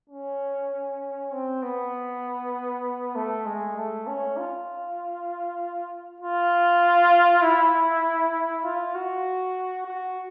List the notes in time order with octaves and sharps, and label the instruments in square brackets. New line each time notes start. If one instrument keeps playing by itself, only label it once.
[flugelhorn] C#4
C4
B3
A3
G#3
A3
C#4
F4
F4
E4
F4
F#4
F#4